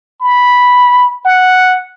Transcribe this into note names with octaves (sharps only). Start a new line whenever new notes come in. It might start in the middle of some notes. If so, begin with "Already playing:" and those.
B5
F#5